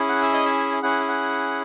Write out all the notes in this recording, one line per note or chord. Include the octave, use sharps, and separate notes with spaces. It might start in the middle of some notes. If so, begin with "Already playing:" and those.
Already playing: C#4 E4 G#4
F#5
E5
D#5
E5
C#4 E4 G#4 F#5
F#5